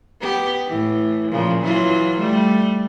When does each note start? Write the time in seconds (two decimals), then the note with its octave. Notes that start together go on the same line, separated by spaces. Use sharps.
0.21 B3 G4
0.67 A2 E3
1.31 A#2 C#3 F3
1.61 E3 F#3 F4
2.17 G3 A3